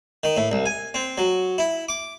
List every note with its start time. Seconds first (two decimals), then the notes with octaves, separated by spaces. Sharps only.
0.23 D#3
0.37 A2
0.52 C2
0.66 G#5
0.94 C4
1.18 F#3
1.58 E4
1.89 D6